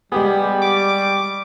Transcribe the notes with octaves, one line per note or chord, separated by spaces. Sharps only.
G3 G#3 B3 G4 G#4
D6